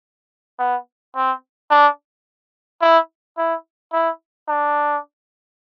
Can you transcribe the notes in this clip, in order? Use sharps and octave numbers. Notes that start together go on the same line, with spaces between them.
B3
C4
D4
E4
E4
E4
D4